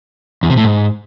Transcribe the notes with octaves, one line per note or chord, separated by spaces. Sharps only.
E2
C3
A2
G#2